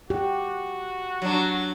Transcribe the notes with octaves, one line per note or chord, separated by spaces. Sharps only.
F#4 G4
F#3 D4